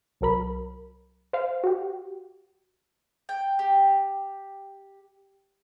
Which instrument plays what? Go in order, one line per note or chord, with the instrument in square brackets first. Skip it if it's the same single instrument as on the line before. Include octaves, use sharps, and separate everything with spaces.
[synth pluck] C2 F#3 A#4 B5
C5 F5
F#4 G4
[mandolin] G5
G4